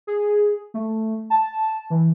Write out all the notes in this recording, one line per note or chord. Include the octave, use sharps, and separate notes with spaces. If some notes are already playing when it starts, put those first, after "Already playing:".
G#4
A3
A5
E3